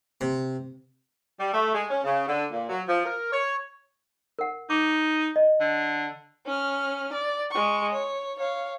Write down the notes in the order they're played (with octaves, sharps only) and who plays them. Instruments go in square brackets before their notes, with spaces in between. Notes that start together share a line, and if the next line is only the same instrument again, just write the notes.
[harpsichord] C3
[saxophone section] G3
A3
G#3
C#4
C#3
D3
A#2
F#3
F3
A#4
C#5
[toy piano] A#4 F#5
[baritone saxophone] D#4 [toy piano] D6
[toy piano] D#5
[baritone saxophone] D3
[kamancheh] C#4 F6
D5
G#3 C#6
C#5
C#5 F5